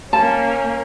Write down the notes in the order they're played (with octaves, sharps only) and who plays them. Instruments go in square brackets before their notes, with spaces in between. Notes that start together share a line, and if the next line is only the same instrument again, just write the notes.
[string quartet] A#3 C#4 [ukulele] A5